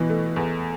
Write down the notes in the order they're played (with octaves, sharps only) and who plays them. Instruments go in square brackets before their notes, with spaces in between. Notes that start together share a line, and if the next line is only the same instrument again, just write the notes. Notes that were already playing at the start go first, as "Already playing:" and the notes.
Already playing: [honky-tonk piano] B2 [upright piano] E3
[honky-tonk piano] A3
E2